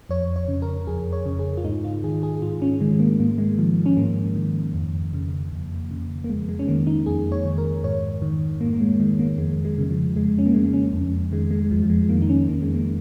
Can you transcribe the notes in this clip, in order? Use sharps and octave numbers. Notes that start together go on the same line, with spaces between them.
F2 C#5
C#5
C#3
A#4
F2 G#4
C#5
C#3
G#4
F4
G#2 D#4
F4
D#3 G#4
G#4
G#2 F4
C#4
D#3 G#3
A#3
G#2 A#3
G#3
D#3 F3
C#4
G#2 A#3
D#3
F2
C#3
F2
C#3
A#3
F2 G#3
G#3
C#4
D#3 A#3
D#4
F2 G#4
C#5
D#3
A#4
G#2 C#5
D#3
G#2 A#3
A#3
G#3
D#3 G#3
A#3
F2 G#3
G#3
C#3 G#3
F3
F2 G#3
C#4
A#3
C#3 G#3
C#4
F2
D#3 G#3
G#3
F2 F3
F3
G#3
D#3 A#3
D#4
C#4
F2 A#3
G#3
A#3